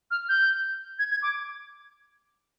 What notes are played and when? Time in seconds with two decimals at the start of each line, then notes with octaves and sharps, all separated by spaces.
0.11 F6
0.29 G6
0.99 G#6
1.11 G#6
1.22 D6